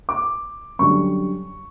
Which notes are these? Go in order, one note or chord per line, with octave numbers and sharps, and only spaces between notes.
D6
F#2 D3 G3 C#6